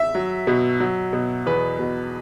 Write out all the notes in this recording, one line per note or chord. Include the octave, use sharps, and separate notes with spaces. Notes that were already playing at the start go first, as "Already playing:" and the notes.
Already playing: E5
F#3
B2
F#3
B2
E2 B4
B2